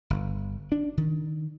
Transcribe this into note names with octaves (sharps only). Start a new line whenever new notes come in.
G1
D4
D#3